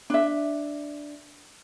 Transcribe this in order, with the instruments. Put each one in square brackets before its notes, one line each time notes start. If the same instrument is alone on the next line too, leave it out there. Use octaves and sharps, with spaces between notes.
[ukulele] D4 E5